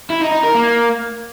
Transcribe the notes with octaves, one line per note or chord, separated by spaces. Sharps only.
E4
D#4
D#4
A#4
A#3